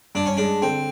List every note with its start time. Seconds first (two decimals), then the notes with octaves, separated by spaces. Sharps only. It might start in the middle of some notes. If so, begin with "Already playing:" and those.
0.15 G2 D4
0.26 C#4
0.37 G#3 D4
0.62 D3 C4